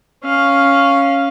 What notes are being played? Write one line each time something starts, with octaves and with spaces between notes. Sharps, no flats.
C#4 F5